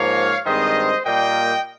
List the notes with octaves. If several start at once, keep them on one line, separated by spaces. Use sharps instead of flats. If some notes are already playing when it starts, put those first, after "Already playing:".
Already playing: G#2 F3 A#3 C#5 F5
G2 D#3 G#3 C4 C5 D#5
A#2 G3 A#3 D#5 G5